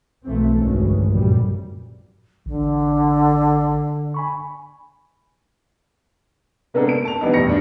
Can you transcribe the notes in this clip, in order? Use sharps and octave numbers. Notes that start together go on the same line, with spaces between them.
B1 E3 A3 A#3 C4
D2 G2 D#3 E3 G#3 C#4
F1 A#1 F#2 A#2 G3
A1 D3
G#5 B5 C#6
C3 G#3 A#3 B3 D4 A4
D7
A5 F7
E3 G3 B3 D4 D#4
E1 A1 G3 A#6 C#7
G2 D4